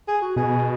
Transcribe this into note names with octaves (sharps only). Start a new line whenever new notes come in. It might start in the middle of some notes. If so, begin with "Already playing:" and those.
G#4
F#4
B2 G#4